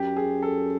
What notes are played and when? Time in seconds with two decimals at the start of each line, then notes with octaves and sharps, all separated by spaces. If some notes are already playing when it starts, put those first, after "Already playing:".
Already playing: F#2 G4
0.17 G#4
0.43 A4